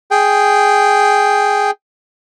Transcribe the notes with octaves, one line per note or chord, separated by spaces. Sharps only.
G#4 G5